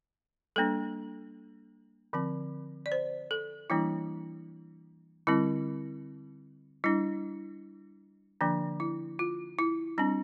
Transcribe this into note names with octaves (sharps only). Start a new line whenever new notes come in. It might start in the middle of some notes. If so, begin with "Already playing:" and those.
G3 A#3 D4 A4
D3 F3 C4
D5
C5
A4
E3 G3 A#3 D4 E4
D3 G3 C4 E4
G3 D4 E4
D3 F3 A#3 D4
E4
F4
E4
G3 C4 D4